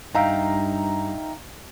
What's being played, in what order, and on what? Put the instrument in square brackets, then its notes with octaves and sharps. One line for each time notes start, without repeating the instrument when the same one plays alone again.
[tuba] G2 [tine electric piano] D#4 E5 G5 [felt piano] F5 A#5